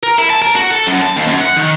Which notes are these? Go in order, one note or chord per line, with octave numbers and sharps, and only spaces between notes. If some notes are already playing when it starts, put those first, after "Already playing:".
A#4
E4
A5
A#4
F#4
A4
F#2
A5
D#2
F#2
F#5
D#3